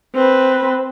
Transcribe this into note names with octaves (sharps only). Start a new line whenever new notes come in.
C4 B4